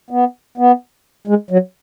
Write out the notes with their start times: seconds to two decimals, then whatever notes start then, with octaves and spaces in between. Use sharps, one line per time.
0.10 B3
0.58 B3
1.27 G#3
1.51 F#3